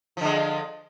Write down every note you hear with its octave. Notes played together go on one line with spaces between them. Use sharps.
D3 F3 G#3